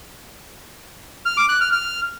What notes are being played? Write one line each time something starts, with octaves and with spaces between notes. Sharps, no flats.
F6
D6
F#6
F6
F6